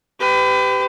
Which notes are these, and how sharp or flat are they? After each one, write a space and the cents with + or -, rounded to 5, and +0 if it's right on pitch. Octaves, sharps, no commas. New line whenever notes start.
G4 +0 B4 +35